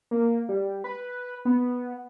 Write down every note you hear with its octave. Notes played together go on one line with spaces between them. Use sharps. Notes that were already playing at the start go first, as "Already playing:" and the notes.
A#3
G3
B4
B3